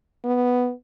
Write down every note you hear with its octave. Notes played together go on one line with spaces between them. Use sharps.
B3